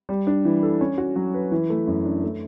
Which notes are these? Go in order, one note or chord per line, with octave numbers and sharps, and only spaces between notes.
G3
D4
E3
A4
C#4
F#4
F#3
B4
E3
A3
F#2
D4
A3